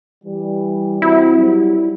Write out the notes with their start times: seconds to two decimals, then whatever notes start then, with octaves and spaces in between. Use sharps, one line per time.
0.25 E3 G3
1.02 C4 E4 F#4
1.36 F#3 G3